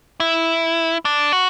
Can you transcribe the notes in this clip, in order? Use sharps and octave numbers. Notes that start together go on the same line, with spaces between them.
E4
D4
F#4